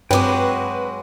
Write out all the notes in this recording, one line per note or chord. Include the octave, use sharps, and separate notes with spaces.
G2 F#3 G#3 C4 F#4 B4 G5 D6